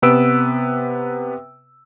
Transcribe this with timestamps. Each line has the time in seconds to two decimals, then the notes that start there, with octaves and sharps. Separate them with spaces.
0.02 C3 B3 B4 E6 D7